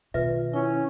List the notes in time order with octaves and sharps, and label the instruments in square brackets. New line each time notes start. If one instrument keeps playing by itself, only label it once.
[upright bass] B2 D#3 [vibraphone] F4 [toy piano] B4 E5
[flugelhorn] C#4 [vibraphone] E4